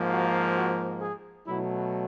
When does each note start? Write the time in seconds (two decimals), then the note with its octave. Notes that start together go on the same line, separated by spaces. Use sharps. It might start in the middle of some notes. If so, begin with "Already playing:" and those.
Already playing: G#2 F3 A#3
0.13 F#4
0.56 F#4
1.00 G#4
1.45 B2 F#3 A3 E4